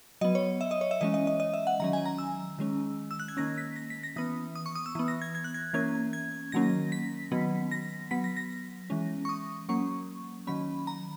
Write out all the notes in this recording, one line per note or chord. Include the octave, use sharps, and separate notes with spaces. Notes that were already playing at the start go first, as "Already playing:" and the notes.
F#3 B3 D#5
C#5
E5
D#5
C#5
E5
E3 G#3 C#4 D#5
D#5
D#5
D#5
E5
F#5
D#3 F#3 C#4 A#5
G#5
A#5
E6
D#3 G#3 C#4
E6
F#6
G#6
D#3 A#3 C#4 A#6
B6
A#6
B6
A#6
E3 B3 D#6
D#6
C#6
D#6
E6
E3 B3
A#6
G#6
G#6
F#6
G#6
E3 A#3 C#4 G#6
G#6
D#3 F#3 A#3 C#4 A#6
B6
D#3 F#3 B3
A#6
F#3 B3 B6
A#6
A#6
E3 G#3 C#4
C#6
D#6
F#3 A#3 C#4 C#6
D#3 F#3 C#4 B5
A#5